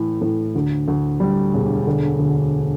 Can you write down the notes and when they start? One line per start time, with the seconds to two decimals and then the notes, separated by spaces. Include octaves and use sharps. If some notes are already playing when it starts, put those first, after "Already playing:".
Already playing: A2 E3
0.21 A2
0.55 D2
0.88 D2
1.20 G3
1.54 E1
1.87 D3
2.19 D2